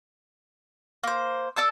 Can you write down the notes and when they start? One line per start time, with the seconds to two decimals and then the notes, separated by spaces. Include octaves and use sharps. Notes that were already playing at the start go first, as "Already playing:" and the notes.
1.03 A#3 C5
1.56 A4 D5 A5 E6